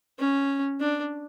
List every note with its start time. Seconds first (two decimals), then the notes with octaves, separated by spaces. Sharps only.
0.19 C#4
0.80 D4